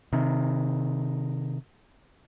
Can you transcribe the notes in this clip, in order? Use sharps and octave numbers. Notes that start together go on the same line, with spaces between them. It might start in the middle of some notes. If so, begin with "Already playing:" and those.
C3 D#3